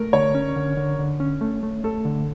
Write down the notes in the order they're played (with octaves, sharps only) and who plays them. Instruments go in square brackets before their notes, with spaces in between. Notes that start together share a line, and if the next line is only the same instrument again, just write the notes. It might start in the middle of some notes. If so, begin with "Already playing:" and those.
Already playing: [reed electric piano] A3 [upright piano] A#4
[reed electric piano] D3 [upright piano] C#5
[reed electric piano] C#4
D3
D3
D3
C#4
A3
A3
[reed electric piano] A3 [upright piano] A4
[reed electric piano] D3